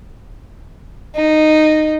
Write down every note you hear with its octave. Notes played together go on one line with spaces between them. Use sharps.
D#4